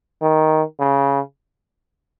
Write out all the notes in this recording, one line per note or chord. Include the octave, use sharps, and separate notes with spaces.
D#3
C#3